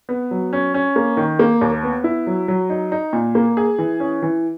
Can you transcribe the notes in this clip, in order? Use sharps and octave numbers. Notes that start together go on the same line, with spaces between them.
B3
F#3
C#4
C#4
A#3
D#3
A#3
D#2
B3
E4
F#3
F#3
D#4
D#4
A#2
A#3
G#4
E3
C#4
E3